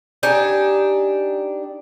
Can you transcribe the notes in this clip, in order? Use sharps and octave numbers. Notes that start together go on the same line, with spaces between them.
D4 D#4 G4 G#5